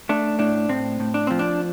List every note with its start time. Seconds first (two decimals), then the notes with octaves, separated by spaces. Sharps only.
0.09 A3 D4
0.39 A2 D4
0.69 A2 C4
1.00 A2
1.14 D4
1.27 F3 C4
1.39 D4